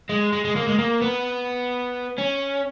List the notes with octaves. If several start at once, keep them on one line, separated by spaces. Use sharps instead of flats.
G#3
G#3
G#3
A#3
G#3
A#3
B3
C#4